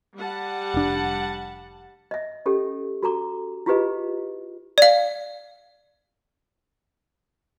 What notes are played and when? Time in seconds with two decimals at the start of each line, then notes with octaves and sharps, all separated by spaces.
0.17 G3 F#5 A5
0.74 F1 D4
2.11 D#5 E5
2.46 C#4 G4 A4
3.03 F#4 A4 A#5 D6
3.66 E4 F4 G4 G#4 B4 D#5
4.78 D5 F5